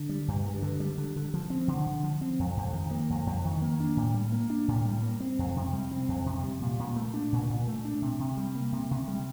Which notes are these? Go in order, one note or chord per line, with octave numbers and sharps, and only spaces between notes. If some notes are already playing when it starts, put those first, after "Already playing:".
Already playing: D3
G3
G2
G2
D3
G3
D3
D3
F3
C4
D3
D3
F3
C4
F2
F2
D#3
A#3
F2
F2
D#3
A#3
D4
A2
G3
A#3
D4
A2
G3
A#3
C4
F2
C3
G3
C4
F2
C3
G3
A#2
A#2
A3
D4
A#2
A#2
A3
D4
C3
C3
G3
A#3
C3
C3
G3